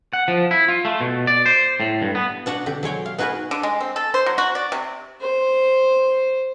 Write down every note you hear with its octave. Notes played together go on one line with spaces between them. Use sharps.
F#5
F3
E4
F4
A3
B2
D5
C5
A2
G2
B3
B2 D4 F#4 F#5
D3 G4
F#3 G#3 C#5 G5
F5
B3 D#4 F#4 G#4 A#4 B4
D3
G#3
C4
A4
C5
F#3
F#4
D5
C3
C5